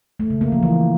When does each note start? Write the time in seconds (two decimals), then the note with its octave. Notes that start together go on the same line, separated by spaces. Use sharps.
0.20 A3
0.30 C#3
0.41 A#3
0.52 F3
0.63 E3